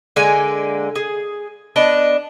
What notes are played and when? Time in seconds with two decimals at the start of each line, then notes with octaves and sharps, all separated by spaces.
0.16 D3 G#3 A#3 G#5
0.96 G#4
1.76 B3 D4 D#5